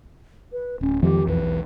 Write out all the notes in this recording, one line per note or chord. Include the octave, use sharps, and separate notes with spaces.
B4
D1 C#4
F2 D#3 E3 G#3 G4
B1 E2 E3 B4